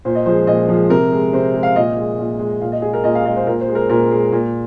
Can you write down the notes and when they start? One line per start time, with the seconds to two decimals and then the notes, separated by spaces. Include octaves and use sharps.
0.05 A#2 C5
0.15 D#5
0.26 F3 G#3 C5
0.47 A#2 D#5
0.69 F3 G#3
0.90 C3 A#4
1.12 G#3
1.33 C3 C5
1.54 G#3
1.63 F5
1.76 A#2 D#5
1.97 G#3
2.19 A#2
2.39 G#3
2.61 A#2 F5
2.72 D#5
2.82 G#3 G#4
2.93 A#4
3.04 A#2 D#5
3.15 F5
3.25 G#3 D#5
3.36 C5
3.46 A#2 A#4
3.61 C5
3.68 G#3
3.75 A#4
3.90 A#2 A#4
4.11 G#3
4.32 A#2